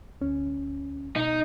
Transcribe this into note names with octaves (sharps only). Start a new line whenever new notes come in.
D2 C#4
B2 D#4